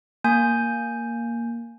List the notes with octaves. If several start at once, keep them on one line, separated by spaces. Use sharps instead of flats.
A#3 G#5 G6